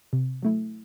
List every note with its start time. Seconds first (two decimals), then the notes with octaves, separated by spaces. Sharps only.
0.13 C3
0.42 F#3 A3 E4